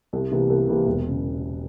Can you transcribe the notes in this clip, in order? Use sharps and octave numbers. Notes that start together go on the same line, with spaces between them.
C2
C3 E3 A#3
C2
C3 E3 A#3
E1
C#3